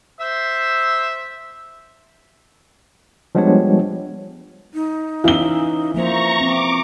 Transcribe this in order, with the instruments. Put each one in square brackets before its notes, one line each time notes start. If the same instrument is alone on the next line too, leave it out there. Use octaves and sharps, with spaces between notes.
[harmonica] C5 E5 E6
[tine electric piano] F3 G3 G#3 B3 D4 C#5
[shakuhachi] D#4
[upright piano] E3 G7 [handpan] C#4 E5 F5
[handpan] F3 A#3 C5 [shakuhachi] E5 [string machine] A#5 C#6
[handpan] C4 [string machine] D6